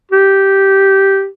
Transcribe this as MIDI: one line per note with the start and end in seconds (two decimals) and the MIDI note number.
0.11 1.27 67